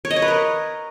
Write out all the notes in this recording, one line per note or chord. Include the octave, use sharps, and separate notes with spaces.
C#5
D#5
C#5
B4
A#4